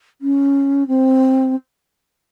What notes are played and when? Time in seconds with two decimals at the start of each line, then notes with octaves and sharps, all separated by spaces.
0.21 C#4
0.87 C4